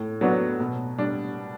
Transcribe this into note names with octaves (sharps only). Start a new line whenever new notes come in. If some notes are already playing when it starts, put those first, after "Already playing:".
Already playing: A2
F#3 B3 D4 F#4
B2
G3 D4